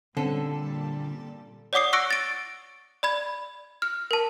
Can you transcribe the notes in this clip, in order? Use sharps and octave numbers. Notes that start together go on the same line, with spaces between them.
A#2 D3 G3 C4 C#4 A4
C#5 D5 F#5 D6 D#6 C7
C#6 E6 F#6 A#6 C#7 D7
A6 D7
D5 B5 G#6
F6
A#4 A5